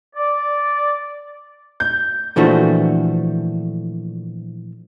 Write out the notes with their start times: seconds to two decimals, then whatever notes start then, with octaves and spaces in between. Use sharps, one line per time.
0.15 D5
1.80 G6
2.36 A#2 E3 F3 A3 D4 F#4